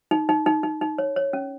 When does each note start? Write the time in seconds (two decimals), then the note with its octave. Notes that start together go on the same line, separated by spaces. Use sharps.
0.11 D#4
0.29 D#4
0.46 D#4
0.63 D#4
0.81 D#4
0.98 C#5
1.16 C#5
1.33 C#4